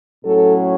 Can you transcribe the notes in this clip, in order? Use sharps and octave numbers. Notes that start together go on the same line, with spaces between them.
A2 F#3 C#4 A4